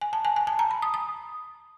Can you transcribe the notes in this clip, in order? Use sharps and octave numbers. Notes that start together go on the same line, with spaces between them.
G#5
A5
G#5
G#5
A5
A#5
B5
D#6
D#6